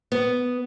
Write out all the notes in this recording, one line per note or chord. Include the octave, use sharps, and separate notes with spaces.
B3